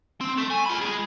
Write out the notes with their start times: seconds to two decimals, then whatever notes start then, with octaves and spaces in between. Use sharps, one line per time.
0.21 C4
0.37 A3
0.50 G#5
0.65 F4 B5
0.81 G#3 G#4